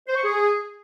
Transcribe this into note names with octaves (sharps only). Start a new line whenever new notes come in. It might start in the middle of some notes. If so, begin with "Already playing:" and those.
C5
C#6
G#4